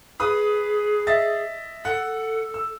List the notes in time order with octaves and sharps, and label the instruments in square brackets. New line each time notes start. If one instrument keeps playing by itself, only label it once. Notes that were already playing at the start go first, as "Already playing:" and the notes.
[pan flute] G#4 [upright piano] B4 B5 D#6
[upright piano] D#5 E5 A6
[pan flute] A4 [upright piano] F#5
[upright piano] E6